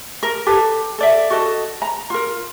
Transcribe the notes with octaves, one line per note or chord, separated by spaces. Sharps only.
A#4
G4 A4 B4
A4 D5 E5
F#4 A4 D#5
A#5
F4 A#4